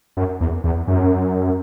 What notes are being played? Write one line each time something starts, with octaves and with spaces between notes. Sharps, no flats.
F#2
E2
E2
F#2